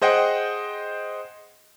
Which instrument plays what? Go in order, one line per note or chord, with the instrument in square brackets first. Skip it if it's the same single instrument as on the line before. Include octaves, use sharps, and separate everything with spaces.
[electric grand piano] G#4 C5 D#5 F#5 G5